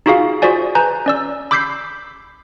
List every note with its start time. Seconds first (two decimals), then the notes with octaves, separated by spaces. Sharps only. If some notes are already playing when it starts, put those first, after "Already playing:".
0.06 D#4 F4 F#4 G#4 F5
0.42 F4 F#4 G#4 C5 D5 G#5
0.75 B4 G#5 A#5 G6
1.06 C#4 D5 E6
1.51 B5 D6 E6 G6 B6 C7